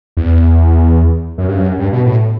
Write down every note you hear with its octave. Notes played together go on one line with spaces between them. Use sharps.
E2
F#2
G2
F#2
G2
B2
A2